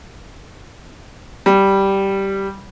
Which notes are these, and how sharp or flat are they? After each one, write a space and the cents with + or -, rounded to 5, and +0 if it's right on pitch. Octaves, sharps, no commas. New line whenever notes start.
G3 -5